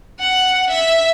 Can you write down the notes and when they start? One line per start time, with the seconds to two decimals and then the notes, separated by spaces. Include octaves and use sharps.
0.19 F#5
0.70 E5